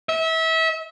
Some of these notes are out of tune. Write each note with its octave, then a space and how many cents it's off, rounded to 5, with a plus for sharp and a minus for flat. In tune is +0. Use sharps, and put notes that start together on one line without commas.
E5 -30